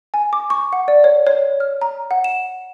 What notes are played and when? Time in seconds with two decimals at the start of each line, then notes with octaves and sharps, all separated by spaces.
0.14 G#5
0.33 D6
0.50 C#6
0.73 F#5
0.88 D5
1.04 C#5
1.27 C#5
1.60 F6
1.82 A#5
2.11 F#5
2.24 E7